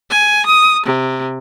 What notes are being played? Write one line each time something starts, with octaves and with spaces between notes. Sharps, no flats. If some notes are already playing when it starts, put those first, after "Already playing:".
G#5
D#6
C3